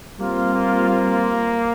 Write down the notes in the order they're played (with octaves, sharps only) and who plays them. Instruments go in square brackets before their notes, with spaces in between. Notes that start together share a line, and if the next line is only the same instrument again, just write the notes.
[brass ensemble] G3 C4 F4 [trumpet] A#3
[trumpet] A#3
A#3